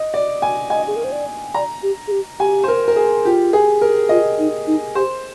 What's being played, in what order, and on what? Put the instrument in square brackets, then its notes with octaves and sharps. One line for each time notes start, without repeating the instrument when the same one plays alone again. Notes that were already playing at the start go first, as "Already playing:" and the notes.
Already playing: [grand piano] D#5
D5
G#5
[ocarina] D#5 [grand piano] G#5
[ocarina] G#4
A#4
C5
D5
[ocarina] D5 [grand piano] A#5
[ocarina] G4
G#4
G4
[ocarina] G4 [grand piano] G#5
[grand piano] C5
A#4
A#4
G#4
[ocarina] F4 [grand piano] G4
[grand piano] G#4
A#4
[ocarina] F4 [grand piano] D#5
[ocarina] D#4
D#4
[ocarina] G4 [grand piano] C5